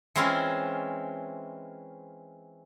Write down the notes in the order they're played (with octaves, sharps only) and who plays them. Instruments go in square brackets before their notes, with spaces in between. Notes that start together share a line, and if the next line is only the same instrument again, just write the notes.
[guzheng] E3 G#3 C4 C#4 E4 F4